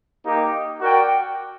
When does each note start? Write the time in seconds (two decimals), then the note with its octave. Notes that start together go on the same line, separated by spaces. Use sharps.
0.26 A#3 D#4 G4
0.81 F#4 A#4 D5 G5